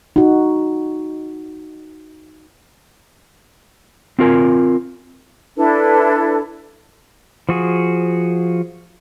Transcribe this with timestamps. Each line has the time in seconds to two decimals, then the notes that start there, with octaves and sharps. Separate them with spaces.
0.16 D#4 F#4
4.19 C4 F4 A#4 G#5
5.56 D4 E4 A4 B4
7.49 F3 F#4 G#4